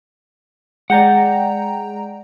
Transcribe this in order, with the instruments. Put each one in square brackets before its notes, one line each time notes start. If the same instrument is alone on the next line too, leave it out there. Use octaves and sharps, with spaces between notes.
[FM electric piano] G#3 G5 A#5 [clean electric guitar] D5 F#5